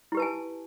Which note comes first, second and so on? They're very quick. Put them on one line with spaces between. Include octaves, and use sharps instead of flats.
E4 G4 B4 A5 G#5